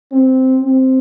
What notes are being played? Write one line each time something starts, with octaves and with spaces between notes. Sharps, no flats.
C4
C4